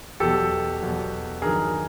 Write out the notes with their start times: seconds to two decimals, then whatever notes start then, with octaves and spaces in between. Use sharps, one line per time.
0.20 E2 B2 F#3 G4 A4
0.81 E2 B2 F#3
1.42 G2 D#3 F#3 G#4 A#4